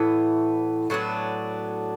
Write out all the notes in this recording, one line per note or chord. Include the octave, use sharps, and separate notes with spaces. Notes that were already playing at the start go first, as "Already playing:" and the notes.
Already playing: A2 E3 B3
A2 F#3 B3 D4